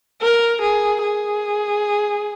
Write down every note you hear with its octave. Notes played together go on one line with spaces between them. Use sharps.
A#4
G#4
G#4